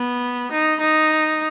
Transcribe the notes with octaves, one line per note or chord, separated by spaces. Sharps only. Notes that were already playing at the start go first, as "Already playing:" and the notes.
Already playing: B3
D#4
D#4